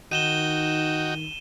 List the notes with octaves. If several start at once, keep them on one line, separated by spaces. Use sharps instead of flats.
D#3 D#4 F#4 G5 D#7 E7 G7